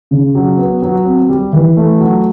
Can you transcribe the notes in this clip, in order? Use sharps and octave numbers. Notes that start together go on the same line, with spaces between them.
C#3
F#3
B3
F#3
C4
G3
E3
A3
F#3